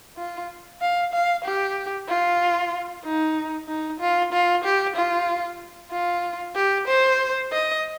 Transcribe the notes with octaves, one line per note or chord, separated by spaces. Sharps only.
F4
F5
F5
G4
F4
D#4
D#4
F4
F4
G4
F4
F4
G4
C5
D#5